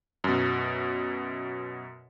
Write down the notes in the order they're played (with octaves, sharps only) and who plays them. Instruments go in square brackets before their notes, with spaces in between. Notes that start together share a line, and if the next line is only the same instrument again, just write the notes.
[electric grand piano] F#2 B2